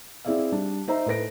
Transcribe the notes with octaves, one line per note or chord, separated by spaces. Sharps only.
C4 E4 G#4 D5 E5 F5
G3 D4
D#4 C5 E5 A#5
A2 A4 B4 A#6 D7